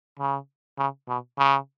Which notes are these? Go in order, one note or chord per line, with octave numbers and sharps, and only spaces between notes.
C#3
C#3
B2
C#3